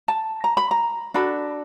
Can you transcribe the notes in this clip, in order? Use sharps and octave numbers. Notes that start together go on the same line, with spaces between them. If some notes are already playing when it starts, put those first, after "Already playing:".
A5
A#5
B5
A#5
D4 F#4 A4 B5